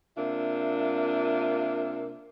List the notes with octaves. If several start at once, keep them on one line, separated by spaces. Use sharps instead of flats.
C3 A#3 D4 F4 E5